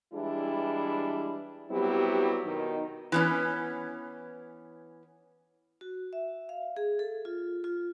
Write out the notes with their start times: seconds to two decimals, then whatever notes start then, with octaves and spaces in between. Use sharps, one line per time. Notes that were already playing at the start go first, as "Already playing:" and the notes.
0.13 E3 G3 G#3 D4 E4
1.71 F#3 G3 B3 C4 E4 G4
2.44 B2 D#3 D#4
3.12 E3 B3 C#4
5.81 F#4
6.13 E5
6.49 F5
6.76 G#4
6.99 A4
7.25 F4
7.64 F4